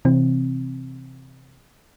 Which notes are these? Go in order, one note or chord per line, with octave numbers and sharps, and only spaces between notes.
C3 E3 C4